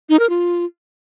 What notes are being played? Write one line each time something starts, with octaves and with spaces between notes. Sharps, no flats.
D#4
A#4
F4